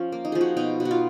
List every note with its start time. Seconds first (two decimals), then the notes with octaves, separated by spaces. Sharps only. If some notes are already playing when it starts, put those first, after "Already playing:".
Already playing: F3 C#4 F4
0.12 A#3
0.25 D#4
0.32 F3 G#4
0.41 F#4
0.57 B2 D#4
0.80 B2
0.85 F#4
0.91 F4